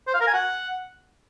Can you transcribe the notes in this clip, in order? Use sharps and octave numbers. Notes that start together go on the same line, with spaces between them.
C5
F5
A#4
G#5
F#5